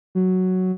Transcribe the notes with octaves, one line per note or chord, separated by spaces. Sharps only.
F#3